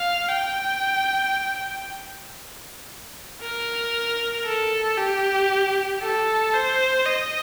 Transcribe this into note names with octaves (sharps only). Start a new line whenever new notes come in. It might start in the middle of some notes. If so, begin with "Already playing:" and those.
Already playing: F5
G5
A#4
A4
G4
A4
C5
D#5